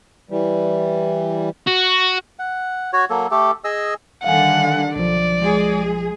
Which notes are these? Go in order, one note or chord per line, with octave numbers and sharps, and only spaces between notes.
E3 G3
F#4
F#5
F#4 C#5
F#3 A#3 A4
A3 G4 A4
G#4 D#5 E6
D3 D#3 G3 F5 F#5 G#5
B1 F3 D5
G#3 G#4